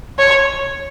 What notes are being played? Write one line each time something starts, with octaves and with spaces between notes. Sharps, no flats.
C#5